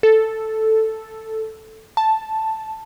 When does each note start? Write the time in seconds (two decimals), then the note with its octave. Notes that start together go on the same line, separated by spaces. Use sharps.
0.03 A4
1.97 A5